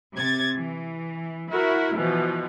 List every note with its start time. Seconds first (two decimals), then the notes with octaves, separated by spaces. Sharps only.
0.15 C3 G#6 A6
0.55 E3
1.50 E4 F#4 A#4
1.97 B2 E3 F3